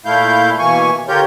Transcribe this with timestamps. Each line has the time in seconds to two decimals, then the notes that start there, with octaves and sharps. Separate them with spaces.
0.06 A#2 A3 E4 F5 G6
0.59 B2 E3 A#3 G#5 C#6
1.08 D3 F4 G4 A#4 C#5 G6